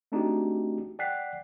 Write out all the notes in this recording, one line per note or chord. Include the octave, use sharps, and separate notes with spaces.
A3 C4 D4 D#4 F#4 G4
D5 F#5 G5 F#6 B6 C7